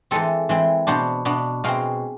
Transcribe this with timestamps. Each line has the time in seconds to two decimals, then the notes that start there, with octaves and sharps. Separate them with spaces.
0.11 E3 G#3 C4 A4
0.49 E3 G#3 C4
0.87 B2 B3 D4 C5
1.25 B2 B3 D4
1.64 B2 G#3 C4 F5